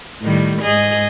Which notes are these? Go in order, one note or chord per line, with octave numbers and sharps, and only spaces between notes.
A2 D#3 G3
G#2 G#4 D#5